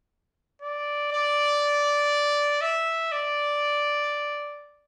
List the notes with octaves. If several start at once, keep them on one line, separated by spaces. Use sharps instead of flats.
D5
D5
E5
D5